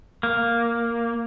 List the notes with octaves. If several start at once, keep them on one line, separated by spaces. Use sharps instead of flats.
A#3